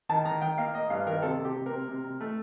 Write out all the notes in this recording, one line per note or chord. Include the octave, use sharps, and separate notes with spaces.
D#3 A5
D#3 A#5
D#3 G5
A#3 F5
A#3 D#5
G2 F5
D#3 A#4
C3 A4
C3
G4
C3
A#4
C3
C3
C3
A3